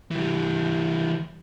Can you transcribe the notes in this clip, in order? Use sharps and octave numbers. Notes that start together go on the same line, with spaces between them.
E3 G3